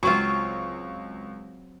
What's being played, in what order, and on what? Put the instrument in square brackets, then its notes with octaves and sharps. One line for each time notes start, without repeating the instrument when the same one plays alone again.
[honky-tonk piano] C#2 C#6 [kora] F#3 C4 F4